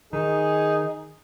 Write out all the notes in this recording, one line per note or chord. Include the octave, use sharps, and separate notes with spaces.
D#3 D#4 G#4